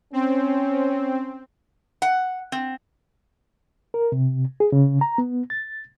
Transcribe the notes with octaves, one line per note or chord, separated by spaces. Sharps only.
C4 C#4
F#5
C4
A#4
C3
G#4
C#3
A#5
B3
A6